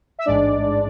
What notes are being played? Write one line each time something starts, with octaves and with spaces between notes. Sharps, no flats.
E5
A1 G#2 G#3 D4 D5